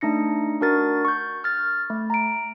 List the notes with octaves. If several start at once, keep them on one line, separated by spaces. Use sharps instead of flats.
A3 D4 D#4 A#6 C#7
D4 F#4 A#4 A6
C#6 G6
F6 A6
A3
A#5 D7